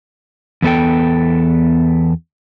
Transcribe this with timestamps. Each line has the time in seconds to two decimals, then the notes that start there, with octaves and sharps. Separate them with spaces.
0.62 E2 B3 A4 G5